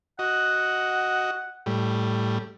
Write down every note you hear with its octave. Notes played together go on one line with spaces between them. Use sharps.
F#4 D#5 F#5
A2 G3